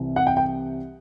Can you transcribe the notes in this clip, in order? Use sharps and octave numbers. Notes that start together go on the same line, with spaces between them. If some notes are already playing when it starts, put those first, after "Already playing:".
Already playing: C2 C3 E3
F#5
G5
G5